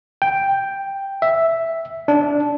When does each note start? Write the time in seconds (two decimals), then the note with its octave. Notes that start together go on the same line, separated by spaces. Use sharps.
0.22 G5
1.22 E5
2.08 D4